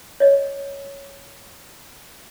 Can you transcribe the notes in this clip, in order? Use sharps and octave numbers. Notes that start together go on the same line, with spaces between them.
C#5 D#5